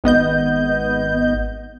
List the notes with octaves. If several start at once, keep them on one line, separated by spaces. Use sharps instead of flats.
G#1 B3 D#5 G6